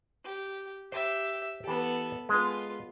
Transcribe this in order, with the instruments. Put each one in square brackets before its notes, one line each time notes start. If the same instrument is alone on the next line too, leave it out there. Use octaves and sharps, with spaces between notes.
[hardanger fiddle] G4
[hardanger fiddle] G4 E5 [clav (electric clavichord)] C5
[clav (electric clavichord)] E3 G4 [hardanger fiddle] B3 A4
[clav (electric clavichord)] G#3 [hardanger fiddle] B3 F4